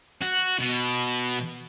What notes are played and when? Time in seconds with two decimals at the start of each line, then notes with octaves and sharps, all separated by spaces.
0.21 F#4
0.59 B2